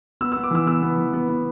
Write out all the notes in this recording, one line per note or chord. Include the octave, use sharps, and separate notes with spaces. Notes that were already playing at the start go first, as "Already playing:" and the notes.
B3 E6
E6
B3
D6
E3 E6
B3 E6
B3
E3
B3
B3